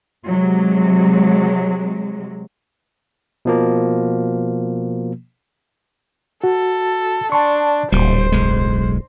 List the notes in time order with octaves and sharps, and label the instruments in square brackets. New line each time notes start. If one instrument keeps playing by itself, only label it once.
[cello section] C3 F#3 G#3
[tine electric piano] B2 F3 A#3
[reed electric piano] F#4 [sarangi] A4
[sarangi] D4 [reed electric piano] A5 C6 C#6
[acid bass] D1 [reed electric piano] C#2 A#2 [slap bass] G3 [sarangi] C5
[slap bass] B1 G#3 [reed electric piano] F#2